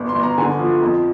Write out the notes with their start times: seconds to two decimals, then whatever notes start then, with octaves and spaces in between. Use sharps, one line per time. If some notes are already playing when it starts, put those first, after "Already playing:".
Already playing: G1
0.09 C6
0.15 G1
0.23 A#5
0.37 D3 G#5
0.59 F3
0.82 F2